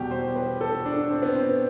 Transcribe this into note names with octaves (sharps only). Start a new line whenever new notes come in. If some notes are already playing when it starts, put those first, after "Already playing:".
Already playing: E2 B2 G3 G4
C5
B4
A4
D4
C4
B3
C4